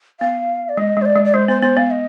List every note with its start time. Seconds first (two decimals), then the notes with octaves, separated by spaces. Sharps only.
0.20 B3 F5
0.69 D5
0.77 G#3 D#5
0.97 G#3
1.02 C5
1.05 D5
1.16 G#3
1.25 D5
1.34 G#3 C5
1.48 B3 C5
1.62 B3 C5
1.77 B3 F5
1.91 D#5